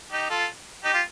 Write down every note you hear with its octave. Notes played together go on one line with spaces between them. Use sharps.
D#4 G4
F4 A4
D#4 G4
F4